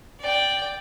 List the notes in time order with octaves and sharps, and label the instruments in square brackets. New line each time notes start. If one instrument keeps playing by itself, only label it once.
[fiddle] D5 G5